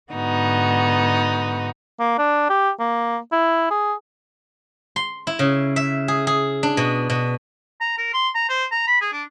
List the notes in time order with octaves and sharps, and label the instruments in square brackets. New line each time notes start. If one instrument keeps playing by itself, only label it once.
[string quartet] G#2 D3 B3 D#4 F#4
[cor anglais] A#3
D4
G4
A#3
E4
G#4
[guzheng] C6
E4
C#3
E5
G#4
G#4
D4
B2
B2
[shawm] A#5
A#4
C6
A#5
C5
A#5
B5
G#4
D4